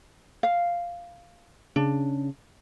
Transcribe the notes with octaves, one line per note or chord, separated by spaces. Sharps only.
F5
C#3 D4